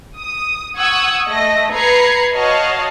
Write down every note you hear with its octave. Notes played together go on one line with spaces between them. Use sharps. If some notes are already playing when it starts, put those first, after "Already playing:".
D#6
F#5 C#6 D#6 E6 F#6 G#6
A3 D#5 A#6
B4 A#5 B5 G#6 C7 C#7
F#4 C#5 D#5 F5 A5